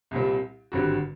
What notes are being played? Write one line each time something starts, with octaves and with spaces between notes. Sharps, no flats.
C2 A#2 G3 C4
G#1 G2 D3 G3 C4 F#4